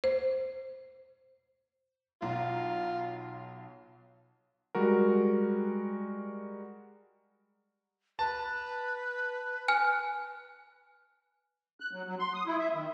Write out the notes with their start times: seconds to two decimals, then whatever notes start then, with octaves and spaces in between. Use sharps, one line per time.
0.04 C5
2.22 B1 F4 A#5
4.75 G3 G#3 F#4 A#4
8.19 B4 A5
9.68 G#5 F6
11.80 F#6
11.93 F#3
12.07 F#3
12.19 C6
12.34 D#6
12.46 E4
12.59 E5
12.74 D#3